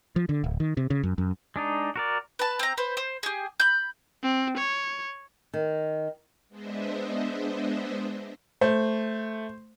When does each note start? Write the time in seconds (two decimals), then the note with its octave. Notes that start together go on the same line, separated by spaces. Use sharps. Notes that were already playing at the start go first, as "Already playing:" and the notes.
0.16 F3
0.29 D3
0.44 D1
0.60 D#3
0.77 C3
0.90 C#3
1.03 F#2
1.18 F#2
1.56 G#3 D4 D#4
1.96 F#4 A#4 D5
2.39 B4 A5
2.59 C4 A#5
2.78 B4 C5
2.97 C5
3.23 G4 G#4
3.60 B5 G6
4.23 C4
4.58 C#5
5.54 D#3
6.49 G#3 B3 D4 C5 D#5 E5
8.61 A3 C5